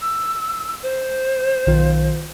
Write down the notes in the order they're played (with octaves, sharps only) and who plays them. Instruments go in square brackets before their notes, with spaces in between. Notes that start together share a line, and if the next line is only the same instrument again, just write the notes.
[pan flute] E6
C5
[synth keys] B1 D#3 F4